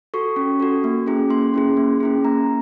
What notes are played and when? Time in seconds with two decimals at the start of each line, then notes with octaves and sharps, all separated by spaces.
0.14 F#4 A4 C#6
0.36 C#4
0.60 F#4 A4
0.84 A#3
1.07 C#4 E4 G#4
1.30 A#3 C6
1.54 C#4 E4 G#4
1.77 A#3
2.00 C#4 E4 G#4
2.25 A#3 A#5